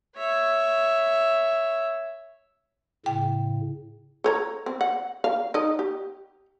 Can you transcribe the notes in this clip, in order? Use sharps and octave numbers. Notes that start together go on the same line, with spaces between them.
C#5 E5
A2 C#3 G5
A4 C#5 A#5
C4
F#5
F5
D#4 D#5
G4